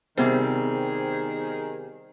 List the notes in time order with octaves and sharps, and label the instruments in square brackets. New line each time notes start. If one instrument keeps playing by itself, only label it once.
[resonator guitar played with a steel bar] C3 G3 [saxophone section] D#3 G#4 [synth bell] B3 C5